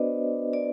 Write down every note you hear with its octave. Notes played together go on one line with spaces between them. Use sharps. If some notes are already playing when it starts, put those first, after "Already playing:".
Already playing: B3 D4 F#4 B4 C5 D5 D#5
D5